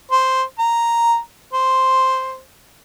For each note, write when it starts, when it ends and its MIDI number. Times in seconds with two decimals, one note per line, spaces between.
0.11 0.43 72
0.59 1.18 82
1.53 2.40 72